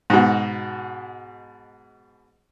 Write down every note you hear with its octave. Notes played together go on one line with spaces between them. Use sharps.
G#2 B2